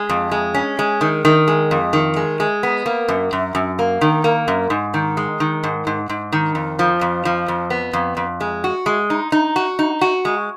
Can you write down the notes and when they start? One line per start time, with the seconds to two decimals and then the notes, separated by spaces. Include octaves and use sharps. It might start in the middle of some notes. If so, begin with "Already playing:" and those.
Already playing: G#3
0.09 F2
0.32 G#3
0.54 C#4
0.79 G#3
1.01 D#3
1.25 D#3
1.48 G#3
1.71 F2
1.93 D#3
2.16 G#3
2.40 G#3
2.63 B3
2.86 A#3
3.08 F#2
3.33 F#2
3.55 F#2
3.79 A#3
4.01 D#3
4.24 A#3
4.48 F#2
4.70 G#2
4.94 D#3
5.17 G#3
5.40 D#3
5.64 G#2
5.87 G#2
6.09 G#2
6.32 D#3
6.55 F2
6.79 F3
7.01 F2
7.25 F3
7.48 F2
7.70 B3
7.93 F2
8.17 F2
8.40 G#3
8.64 F#4
8.86 G#3
9.10 D#4
9.32 D#4
9.56 F#4
9.79 D#4
10.01 F#4
10.25 G#3